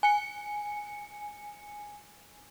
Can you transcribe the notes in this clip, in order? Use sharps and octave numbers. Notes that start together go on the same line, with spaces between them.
G#5 C#7